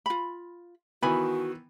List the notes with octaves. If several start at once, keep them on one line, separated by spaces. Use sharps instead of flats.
F4 B5
D#3 E3 B3 F#4 G#5 B5